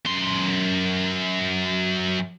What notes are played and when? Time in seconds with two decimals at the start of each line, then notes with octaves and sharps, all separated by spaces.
0.06 F#2 C6